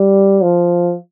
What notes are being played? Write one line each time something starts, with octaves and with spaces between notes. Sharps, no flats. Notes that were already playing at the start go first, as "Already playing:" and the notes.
Already playing: G3
F3